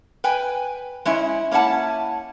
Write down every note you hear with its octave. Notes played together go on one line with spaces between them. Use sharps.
B4 G5 G#5
G#3 C#4 E4 E5
A#3 C#4 E4 F#5 A5